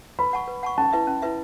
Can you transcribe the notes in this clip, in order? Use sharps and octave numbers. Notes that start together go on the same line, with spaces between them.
B4 B5
F#5 A5 C#6
B4
F#5 A5 C#6
C#4 A5
E4 B4 E5
C#4
E4 B4 E5